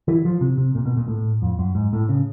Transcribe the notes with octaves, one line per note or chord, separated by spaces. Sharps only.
E3
F3
C3
C3
A#2
B2
A#2
A2
F2
F#2
G#2
A2
C#3